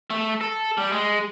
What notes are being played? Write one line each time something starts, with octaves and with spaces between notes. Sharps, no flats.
A3
A4
G3
G#3